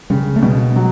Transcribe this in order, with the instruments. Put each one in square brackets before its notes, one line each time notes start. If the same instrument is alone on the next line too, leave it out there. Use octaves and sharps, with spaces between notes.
[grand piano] C#3 [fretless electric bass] G3
[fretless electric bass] A3
[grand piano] B2 [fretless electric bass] G3
[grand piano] F#3